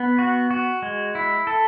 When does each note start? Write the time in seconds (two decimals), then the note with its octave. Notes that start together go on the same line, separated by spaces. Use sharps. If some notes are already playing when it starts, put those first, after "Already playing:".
Already playing: B3
0.19 F#4
0.51 F#4
0.82 G#3
1.15 E4
1.47 A4